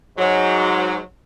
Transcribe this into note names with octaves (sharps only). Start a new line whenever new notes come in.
G#2 F#3